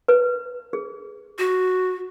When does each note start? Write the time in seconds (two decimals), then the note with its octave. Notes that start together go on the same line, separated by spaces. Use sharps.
0.08 B4
0.73 G#4
1.39 F#4